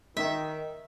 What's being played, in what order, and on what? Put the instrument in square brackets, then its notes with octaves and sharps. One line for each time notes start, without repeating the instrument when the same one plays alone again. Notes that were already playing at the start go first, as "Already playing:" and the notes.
[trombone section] D#3 [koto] E5